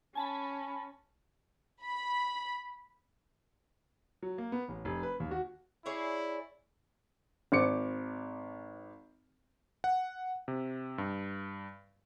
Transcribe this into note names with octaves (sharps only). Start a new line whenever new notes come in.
C#4 G#5 A5 B5
B5
F#3
A#3
B3
A1
F1
B4
D#2
F#4
E4 G#4 C#5 D5
G#1 C5 D6 C#7
F#5
C3
G2